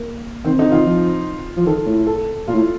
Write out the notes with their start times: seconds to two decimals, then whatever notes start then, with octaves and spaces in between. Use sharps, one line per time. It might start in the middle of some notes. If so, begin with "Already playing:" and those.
Already playing: A#3
0.44 D#3 C4
0.58 D3 D#4
0.71 D#3 F4
0.86 F3
1.57 F3
1.66 D#3 A4
1.86 A2
2.06 A4
2.48 A#2 F4
2.54 A2